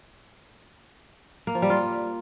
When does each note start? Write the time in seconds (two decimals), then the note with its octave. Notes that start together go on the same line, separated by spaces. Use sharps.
1.47 A#3
1.55 F3
1.62 G3
1.70 F4